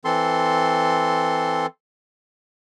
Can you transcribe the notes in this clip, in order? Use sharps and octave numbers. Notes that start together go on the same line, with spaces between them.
E3 C4 A4 C6